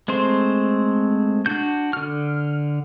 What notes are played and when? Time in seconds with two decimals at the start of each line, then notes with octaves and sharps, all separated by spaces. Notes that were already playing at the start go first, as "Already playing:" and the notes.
0.08 G#3 A3 C4 C5 C6
1.46 D4 F#4 G6
1.93 D3 F6